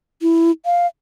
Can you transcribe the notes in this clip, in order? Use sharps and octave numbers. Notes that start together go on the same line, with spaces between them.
E4
F5